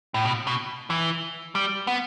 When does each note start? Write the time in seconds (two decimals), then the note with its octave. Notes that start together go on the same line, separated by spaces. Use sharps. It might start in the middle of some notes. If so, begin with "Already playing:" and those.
0.14 A2
0.25 B2
0.47 B2
0.90 E3
1.55 G3
1.87 B3